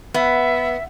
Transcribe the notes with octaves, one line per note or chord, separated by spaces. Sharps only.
B3 E5